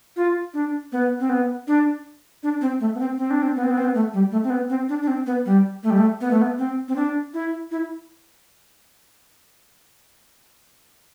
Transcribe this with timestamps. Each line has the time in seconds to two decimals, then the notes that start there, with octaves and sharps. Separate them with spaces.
0.16 F4
0.54 D4
0.92 B3
1.20 C4
1.29 B3
1.67 D4
2.43 D4
2.61 C4
2.80 A3
2.95 B3
3.00 C4
3.18 C4
3.31 D4
3.42 C4
3.56 B3
3.64 C4
3.71 B3
3.78 C4
3.85 B3
3.94 A3
4.13 G3
4.31 A3
4.44 C4
4.50 B3
4.70 C4
4.89 D4
5.03 D4
5.07 C4
5.26 B3
5.46 G3
5.83 A3
5.90 G3
5.97 A3
6.21 B3
6.31 A3
6.42 B3
6.58 C4
6.88 C4
6.96 D4
7.34 E4
7.71 E4